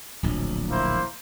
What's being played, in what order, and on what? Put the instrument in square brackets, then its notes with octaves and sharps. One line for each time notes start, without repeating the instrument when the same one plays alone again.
[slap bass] D1 A#1
[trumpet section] A#3 E4 C5